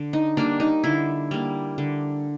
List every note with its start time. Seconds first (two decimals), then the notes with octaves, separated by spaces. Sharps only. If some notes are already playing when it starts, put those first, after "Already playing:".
Already playing: D3
0.13 D#4
0.37 G3 A#3 D4
0.60 D#4
0.84 D3 E4
1.31 G3 A#3
1.78 D3